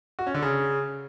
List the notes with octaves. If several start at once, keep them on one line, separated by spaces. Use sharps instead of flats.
F#4
C#4
D3
C#3